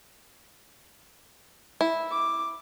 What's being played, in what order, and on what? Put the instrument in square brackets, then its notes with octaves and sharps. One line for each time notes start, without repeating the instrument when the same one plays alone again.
[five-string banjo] E4
[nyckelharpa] D6